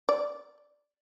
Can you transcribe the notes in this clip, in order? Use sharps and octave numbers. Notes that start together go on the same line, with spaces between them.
D5